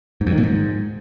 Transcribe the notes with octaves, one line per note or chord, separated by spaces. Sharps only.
G#2
F2
D#3
A#2
G#2